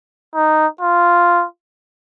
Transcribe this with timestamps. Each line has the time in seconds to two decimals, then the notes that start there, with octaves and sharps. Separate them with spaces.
0.35 D#4
0.81 F4